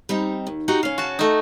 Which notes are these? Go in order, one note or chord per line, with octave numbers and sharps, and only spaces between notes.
G3 C4 D#4
D#2
D#4 F#4 G4
C#3 C#4 F5
F#4 A5
A3 D#4